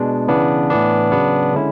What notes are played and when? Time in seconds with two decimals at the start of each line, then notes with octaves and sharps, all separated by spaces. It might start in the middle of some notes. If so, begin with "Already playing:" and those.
Already playing: B2 G#3 D4
0.28 C#3 E3 B3 D4
0.70 A2 E3 B3 D4
1.12 C#3 F#3 B3 D4
1.54 D3 G#3 C#4 E4